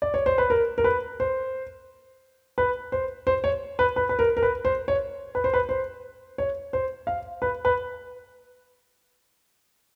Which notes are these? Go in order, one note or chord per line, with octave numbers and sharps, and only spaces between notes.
D5
C#5
C5
B4
A#4
A#4
B4
C5
B4
C5
C5
C#5
B4
B4
B4
A#4
A#4
B4
C5
C#5
B4
C5
B4
C5
C#5
C5
F5
B4
B4